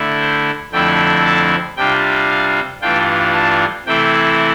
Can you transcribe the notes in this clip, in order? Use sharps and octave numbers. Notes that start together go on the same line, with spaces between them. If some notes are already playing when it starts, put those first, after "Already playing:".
Already playing: D3 A3 E4
C5
F2 D3 A3 C4 E4 G5
A5
C3 G3 D4 F4 G5
F5
G2 E3 A3 D4 F4 G5
A5
C3 E3 A3 C4 E4 G5